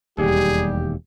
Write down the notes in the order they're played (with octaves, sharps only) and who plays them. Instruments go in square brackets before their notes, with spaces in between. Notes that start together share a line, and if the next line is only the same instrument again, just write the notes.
[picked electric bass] E1 D#2 [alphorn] G3 [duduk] G4 [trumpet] G#4